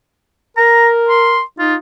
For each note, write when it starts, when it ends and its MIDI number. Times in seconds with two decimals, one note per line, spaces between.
0.57 1.40 70
0.57 0.88 82
1.09 1.41 84
1.59 1.75 63
1.59 1.75 65